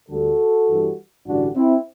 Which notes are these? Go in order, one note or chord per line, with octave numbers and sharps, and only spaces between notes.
D2 D3 G3 F#4 A4
G2 E3 G3
A1 G2 D3 G3 D4 F#4
C4 E4